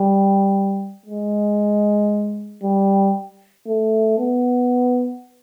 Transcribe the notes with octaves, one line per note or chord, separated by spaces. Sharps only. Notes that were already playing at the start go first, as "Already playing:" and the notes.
Already playing: G3
G#3
G3
A3
B3